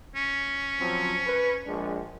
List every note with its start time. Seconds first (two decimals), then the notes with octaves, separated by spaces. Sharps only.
0.15 C#4
0.79 F3 F#3 C4
1.27 B4
1.67 A#1 G#3 D4